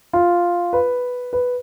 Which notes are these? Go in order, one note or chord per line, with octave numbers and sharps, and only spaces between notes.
F4
B4
B4